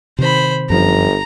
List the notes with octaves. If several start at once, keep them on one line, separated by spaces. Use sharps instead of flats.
C3 D#3 C5 B5
G1 F#2 F3 A#5